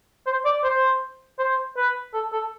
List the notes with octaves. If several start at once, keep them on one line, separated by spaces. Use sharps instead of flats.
C5
D5
C5
C5
B4
A4
A4